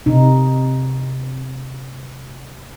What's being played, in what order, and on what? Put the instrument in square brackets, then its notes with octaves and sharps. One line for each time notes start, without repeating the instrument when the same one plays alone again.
[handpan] C3 D#4